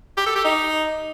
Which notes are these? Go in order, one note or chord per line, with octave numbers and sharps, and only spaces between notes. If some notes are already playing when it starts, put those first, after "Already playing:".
G4
A4
G4
D#4